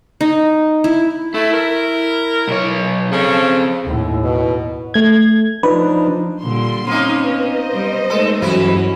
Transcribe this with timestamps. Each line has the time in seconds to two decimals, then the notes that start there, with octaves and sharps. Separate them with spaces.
0.21 D#4
0.84 E4
1.34 A3 E4
1.54 A#4
2.48 B1 C#5
3.12 C#3 C4 A4
3.84 D#2 A2
4.24 B2
4.94 A3 G#6
5.63 F3 D4 D#4 B4
6.42 A#2 D3 G3 C6
6.87 A#3 C4 C#4 D#4 D#6
7.24 B3 C5 D#5
7.73 G3
8.10 G#3 A3 D#4 A4
8.42 G2 E3 F#3 C#4 E4 F#4 B4